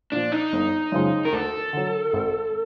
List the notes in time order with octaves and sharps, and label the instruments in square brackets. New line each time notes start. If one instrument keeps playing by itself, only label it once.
[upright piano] A#2 F3 [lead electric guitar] D4
[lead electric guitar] D#4
[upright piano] G1
F#2 C#3 F3 G#3
[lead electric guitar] A#4
[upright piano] D2 [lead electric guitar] A4
[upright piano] D3 F#3
G#1